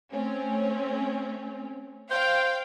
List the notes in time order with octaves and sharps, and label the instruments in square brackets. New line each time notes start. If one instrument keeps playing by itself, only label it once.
[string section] A3 C4 C#4
[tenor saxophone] C5 [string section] F5 G5